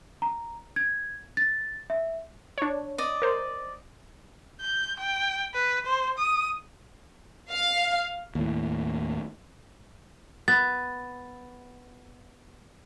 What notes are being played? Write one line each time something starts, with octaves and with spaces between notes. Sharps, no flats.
A#5
G#6
A6
E5
D4 C#5
D5 D#5
A#4 C5
G6
G5
B4
C5
D#6
F5
D#2 A2
B3 A6